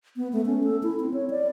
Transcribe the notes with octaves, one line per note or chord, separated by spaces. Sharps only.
B3
A3
C#4
A4
E4
C4
C#5
D5